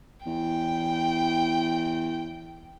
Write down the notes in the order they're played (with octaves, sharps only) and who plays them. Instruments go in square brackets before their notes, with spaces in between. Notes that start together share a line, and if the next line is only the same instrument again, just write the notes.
[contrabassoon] E2 [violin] G5